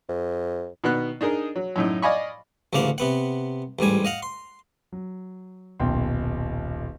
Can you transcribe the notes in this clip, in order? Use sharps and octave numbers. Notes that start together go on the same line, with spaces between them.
F2
B2 D#3 B3 F#6
D4 D#4 G#4 A#4
F#3
F#2 A2 D#4
D5 D#5 F5 G#5 B5 C#6
A1 D2 C#3 A#3 F5 F#5
C3 B3 F#5
A1 G#2 G3 G#5
D#5 F5 F#5
C6
F#3
D#1 B1 G5 C6